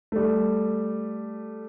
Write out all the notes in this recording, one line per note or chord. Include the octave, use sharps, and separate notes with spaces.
G3 A3